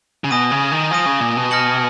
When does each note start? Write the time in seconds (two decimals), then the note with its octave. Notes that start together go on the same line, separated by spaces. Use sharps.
0.24 C#3
0.31 B2 G#5 D#6 A#6 D#7
0.51 C#3
0.72 D#3
0.91 F3 G#5 D#6 A#6 D#7
1.06 C#3
1.21 A#2
1.37 B2
1.51 F6 A#6 C#7 F#7